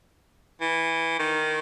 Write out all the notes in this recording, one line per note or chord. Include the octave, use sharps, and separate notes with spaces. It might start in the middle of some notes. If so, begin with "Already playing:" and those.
E3
D#3